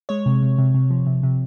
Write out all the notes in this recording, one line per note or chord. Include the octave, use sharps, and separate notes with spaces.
G#3 C#5
C3
C3
C3
C3
F3
C3
C3